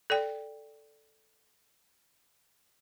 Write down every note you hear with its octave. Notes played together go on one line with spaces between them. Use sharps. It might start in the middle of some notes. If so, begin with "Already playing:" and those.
A4 D5 G5